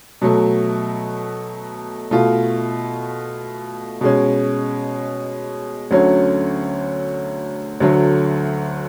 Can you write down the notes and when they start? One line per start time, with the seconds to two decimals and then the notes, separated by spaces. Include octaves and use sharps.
0.21 B2 F#3 A3
2.11 B2 A3 F4
4.01 B2 G#3 C#4
5.91 D2 D3 F#3 C#4
7.80 D2 D3 F#3 A3